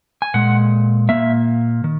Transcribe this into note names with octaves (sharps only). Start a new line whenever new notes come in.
G#5
A#2 G#3 F#5
A#2 A#3 E5
D#3